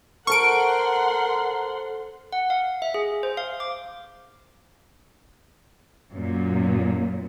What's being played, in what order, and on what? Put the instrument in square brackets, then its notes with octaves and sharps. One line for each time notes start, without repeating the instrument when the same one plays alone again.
[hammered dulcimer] A4 C5 [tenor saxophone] A#4 [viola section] F#5 C6 [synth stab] C#6 D7
[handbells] F#5
F5
E5
G#4
C5
F5
D6
[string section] F#2 A#2